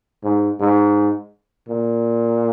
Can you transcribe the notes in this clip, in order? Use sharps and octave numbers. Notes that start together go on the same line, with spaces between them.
G#2
G#2
A#2